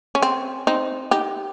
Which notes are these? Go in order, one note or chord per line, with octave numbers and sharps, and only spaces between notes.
C#4
C4
C4 D#4
D#4 G4